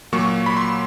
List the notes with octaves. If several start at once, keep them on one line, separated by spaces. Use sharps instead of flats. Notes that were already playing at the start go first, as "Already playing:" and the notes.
A#2 F#3 A#3 C#6
B5
C6